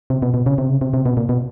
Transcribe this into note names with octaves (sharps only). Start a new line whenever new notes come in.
C3
B2
B2
C#3
C3
C#3
C3
C3
B2
A#2
B2